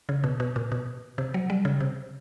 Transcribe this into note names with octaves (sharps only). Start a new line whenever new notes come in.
C#3
B2
B2
A#2
B2
C3
F#3
G3
C#3
C3